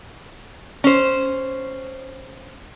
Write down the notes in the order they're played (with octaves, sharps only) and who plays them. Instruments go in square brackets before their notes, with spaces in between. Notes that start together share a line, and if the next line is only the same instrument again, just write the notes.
[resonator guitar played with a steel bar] C#4 C5